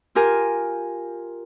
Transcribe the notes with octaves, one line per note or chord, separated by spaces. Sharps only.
F4 G4 A#4 G#5